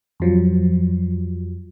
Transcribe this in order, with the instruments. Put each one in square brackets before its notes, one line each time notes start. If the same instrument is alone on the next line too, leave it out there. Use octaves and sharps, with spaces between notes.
[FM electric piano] F2 F3 F#3